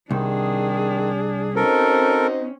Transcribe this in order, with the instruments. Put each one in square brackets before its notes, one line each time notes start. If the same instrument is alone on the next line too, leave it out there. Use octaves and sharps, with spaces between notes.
[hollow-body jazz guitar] C2 [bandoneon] D#3 [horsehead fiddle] D4 G#4
[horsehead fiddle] C4 C#4 [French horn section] D#4 F#4 C5 [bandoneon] A4 A#4